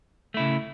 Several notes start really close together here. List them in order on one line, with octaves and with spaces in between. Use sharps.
A3 E4 C#3